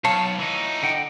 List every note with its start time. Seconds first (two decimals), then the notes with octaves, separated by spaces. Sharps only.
0.05 B1 C#5 F5 A5
0.40 E3 D#4
0.83 D3 F#5 G5